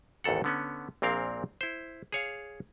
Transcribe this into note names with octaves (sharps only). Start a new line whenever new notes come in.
A1 D#2 G#2 A4 F#5
D3 B3 C#4
A#1 A#2 C4 A#4 F5
E4 C5
G#4 C#5 F5